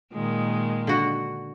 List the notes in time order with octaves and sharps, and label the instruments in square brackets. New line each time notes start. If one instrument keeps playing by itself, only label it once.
[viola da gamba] A#2 D#3 G#3
[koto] D3 F#4